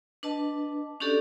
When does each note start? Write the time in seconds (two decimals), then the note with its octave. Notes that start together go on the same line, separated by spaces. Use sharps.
0.23 D4 B4 D#5 A5
1.00 C#4 D4 F#4 G4 A4 D5